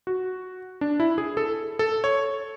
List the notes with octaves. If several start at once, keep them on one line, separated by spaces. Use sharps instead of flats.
F#4
D4
E4
G#4
A4
A4
C#5